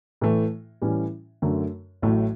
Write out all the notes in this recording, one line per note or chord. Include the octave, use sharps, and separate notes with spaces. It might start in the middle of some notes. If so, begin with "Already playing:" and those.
A2 E3 A3
A2 E3 G3 C#4
F#2 D3 A3
A1 A2 F#3 A3